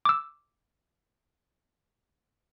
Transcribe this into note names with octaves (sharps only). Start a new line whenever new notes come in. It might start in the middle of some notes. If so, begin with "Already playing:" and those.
D6 E6